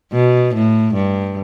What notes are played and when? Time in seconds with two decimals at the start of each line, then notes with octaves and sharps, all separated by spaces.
0.13 B2
0.54 A2
0.94 G2